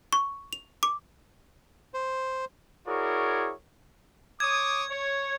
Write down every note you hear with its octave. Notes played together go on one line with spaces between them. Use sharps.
C#6
F7
D6
C5
E4 F#4 G#4 A#4 C#5 D5
C#5 D6 D#6 G#6
C#5